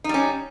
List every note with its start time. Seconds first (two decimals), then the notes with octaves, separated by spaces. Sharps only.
0.04 D#4
0.09 G3
0.14 C#4